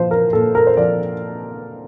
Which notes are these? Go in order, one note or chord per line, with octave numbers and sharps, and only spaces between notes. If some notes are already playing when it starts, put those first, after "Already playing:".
Already playing: A#2 F3 C5
A#4
A#2 A4
A#4
C5
F3 D5